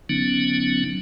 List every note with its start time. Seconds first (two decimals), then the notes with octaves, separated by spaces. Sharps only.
0.09 D3 F#3 B3 C#4 D#4